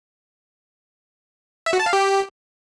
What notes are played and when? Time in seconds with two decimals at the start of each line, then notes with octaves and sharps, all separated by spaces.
1.66 E5
1.73 F#4
1.80 A5
1.86 F5
1.93 G4